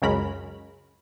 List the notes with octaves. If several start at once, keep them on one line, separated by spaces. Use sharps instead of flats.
C#2 F#2 C#3 G#3 A#4 B5